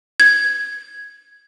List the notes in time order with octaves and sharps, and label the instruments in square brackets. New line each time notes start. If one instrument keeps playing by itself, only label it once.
[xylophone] G#6